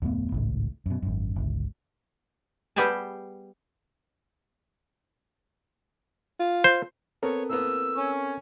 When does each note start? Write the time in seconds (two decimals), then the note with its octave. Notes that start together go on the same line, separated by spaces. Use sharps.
0.02 D1 F2 A3 B3
0.32 G#1 C#2 A2
0.86 F#2 B2
1.02 G#1 F#2
1.36 G1 C#2
2.76 G3 B3 G4 G#4 G#5 A5
6.39 F4
6.64 C5
7.23 B3 C4 A4 A#4 C#5
7.49 A2 A#3 B3 E6
7.96 C#4